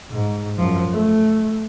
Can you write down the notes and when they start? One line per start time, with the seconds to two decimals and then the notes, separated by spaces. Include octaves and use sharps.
0.11 G#2
0.58 F#2 F3
0.90 A3